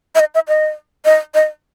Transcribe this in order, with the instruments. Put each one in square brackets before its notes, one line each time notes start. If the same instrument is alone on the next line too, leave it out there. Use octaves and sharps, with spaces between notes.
[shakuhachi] E5
D#5
E5
D#5
D#5
D#5